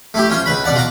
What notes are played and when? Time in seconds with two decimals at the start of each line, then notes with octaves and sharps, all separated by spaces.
0.14 A3 E4 G4
0.30 C#4 F4 C5
0.46 C#2 B4 B5
0.64 B2 D5 F#5 A5
0.76 F4 A#5 D6